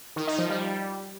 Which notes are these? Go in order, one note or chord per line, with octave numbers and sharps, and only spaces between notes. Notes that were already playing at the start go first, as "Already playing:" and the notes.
D#3
D#4
F3
G3